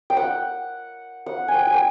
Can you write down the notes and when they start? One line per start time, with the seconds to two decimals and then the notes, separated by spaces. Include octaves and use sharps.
0.10 G5
0.17 F#5
1.26 F#5
1.48 G#5
1.54 G5
1.67 G#5
1.74 G5